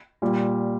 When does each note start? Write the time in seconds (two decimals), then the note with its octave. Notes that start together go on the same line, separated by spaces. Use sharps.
0.22 A#2 G3